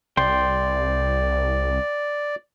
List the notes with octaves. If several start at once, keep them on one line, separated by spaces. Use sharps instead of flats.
C2 D5 G5 C6